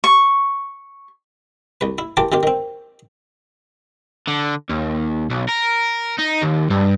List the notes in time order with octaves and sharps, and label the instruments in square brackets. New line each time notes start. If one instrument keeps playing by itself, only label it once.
[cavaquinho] C#6
[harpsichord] C2 B4
E4
E3 F4 G4 A#4 A5 D6
C3 D#3 F4 G4
D#3 C4
[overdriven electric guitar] D3
D#2
B1
A#4
D#4
D#2
G2